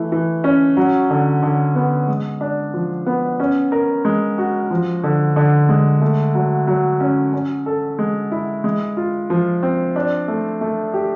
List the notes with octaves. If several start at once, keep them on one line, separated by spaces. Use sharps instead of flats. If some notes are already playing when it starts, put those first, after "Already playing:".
Already playing: E3 A3
E3
C#4
F#3
D3
D3
B3
G#3
D4
F3
B3
C#4
A#4
G#3
F#4
F3
D3
D3
G#3
A3
F#3
F#3
C#4
C#4
A4
G#3
E4
G#3
F4
F3
C4
D4
A3
A3
G4